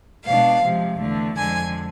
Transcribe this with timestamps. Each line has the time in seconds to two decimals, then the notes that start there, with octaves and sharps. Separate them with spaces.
0.25 B2 G#3 D4 F5
0.63 C3 F3 G#3
0.99 E2 D3 A3
1.36 F2 D3 G#3 G#5